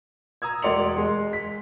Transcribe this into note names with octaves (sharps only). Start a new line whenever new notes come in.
A#5 D#6 E6 G#6
E1 A#4 D5 C6 C#7 F7
G#3 C6
B6